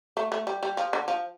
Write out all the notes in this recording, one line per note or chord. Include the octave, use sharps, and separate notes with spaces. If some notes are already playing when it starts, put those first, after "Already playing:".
A3
A3
G3
G3
F3
D3
F3